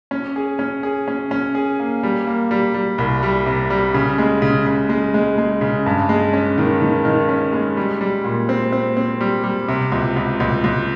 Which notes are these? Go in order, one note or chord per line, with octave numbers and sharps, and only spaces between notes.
C#4
G#4
C#4
G#4
C#4
C#4
G#4
A#3
G3
A#3
G3
G3
C2
G3
C3
G3
C#3
G#3
C#3
C#3
G#3
G#3
G#3
C#3
G2
G#3
C#4
D#3
D#3
D#3
C#4
G#3
G3
G3
A#2
C4
C4
C4
G3
G3
C3
C#2
C#2
C#2
C#2